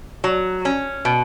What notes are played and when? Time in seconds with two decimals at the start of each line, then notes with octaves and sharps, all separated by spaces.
0.24 F#3
0.65 C#4
1.05 B2